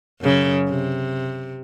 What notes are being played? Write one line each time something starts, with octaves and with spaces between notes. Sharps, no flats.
F#2 C#3
C3